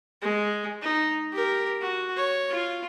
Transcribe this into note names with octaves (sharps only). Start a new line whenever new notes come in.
G#3
D#4
G4 A#4
F#4
C#5
F4